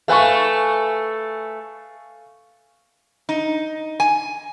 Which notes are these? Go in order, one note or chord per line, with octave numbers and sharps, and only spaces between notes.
A3 B4 F5 G#5 C#6
D#4
G#5